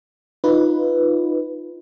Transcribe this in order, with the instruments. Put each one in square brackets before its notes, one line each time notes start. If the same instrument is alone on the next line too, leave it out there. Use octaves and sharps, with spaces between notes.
[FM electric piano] D#4 F4 B4